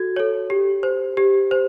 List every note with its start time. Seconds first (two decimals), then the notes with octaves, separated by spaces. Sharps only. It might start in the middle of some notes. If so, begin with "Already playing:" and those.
Already playing: F#4 A4 G#6
0.16 A4 C#5
0.50 G4
0.83 C5
1.17 G4
1.51 C5